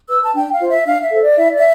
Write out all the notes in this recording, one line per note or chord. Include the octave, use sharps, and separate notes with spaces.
B4 E6
A5
D4 G5
F5
F4 C5
E5
D4 F5
E5
A4 C5
D5
E4 E5
D5
E5